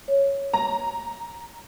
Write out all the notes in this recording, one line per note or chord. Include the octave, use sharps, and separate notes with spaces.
C#5
A#5